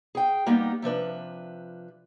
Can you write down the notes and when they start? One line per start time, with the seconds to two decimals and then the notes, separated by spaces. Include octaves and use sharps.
0.15 G#4 G5
0.46 G3 A#3 B3 D#4 G4
0.82 C3 F3 D4 B4